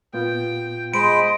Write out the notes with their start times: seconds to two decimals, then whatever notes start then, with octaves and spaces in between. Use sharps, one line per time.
0.13 A#2 B3 F4 G5
0.94 G#3 C5 D#5 B5 D7